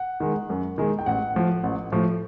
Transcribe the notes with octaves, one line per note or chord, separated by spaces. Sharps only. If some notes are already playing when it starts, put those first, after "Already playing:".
Already playing: F#5
D#3 G#3
F#2
D#3 G#3
G5
A1 F#5
A2 F3
A1
A2 F3